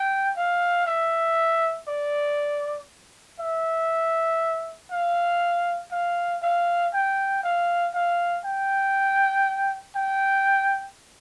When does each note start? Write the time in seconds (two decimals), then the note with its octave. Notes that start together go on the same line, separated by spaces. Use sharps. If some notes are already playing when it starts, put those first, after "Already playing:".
Already playing: G5
0.37 F5
0.87 E5
1.88 D5
3.40 E5
4.91 F5
5.92 F5
6.42 F5
6.93 G5
7.43 F5
7.94 F5
8.45 G5
9.96 G5